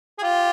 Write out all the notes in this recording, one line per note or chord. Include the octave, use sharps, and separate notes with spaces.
G#4
F4 G4